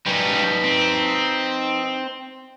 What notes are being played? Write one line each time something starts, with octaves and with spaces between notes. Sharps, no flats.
G3 C#4 D#4 B4
C4